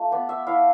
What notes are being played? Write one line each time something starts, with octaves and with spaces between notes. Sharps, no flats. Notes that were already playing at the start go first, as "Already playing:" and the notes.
Already playing: A3 F4
B3 D5
E5
E4 F5